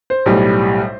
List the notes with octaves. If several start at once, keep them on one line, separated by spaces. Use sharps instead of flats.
C5
B1 A2 G3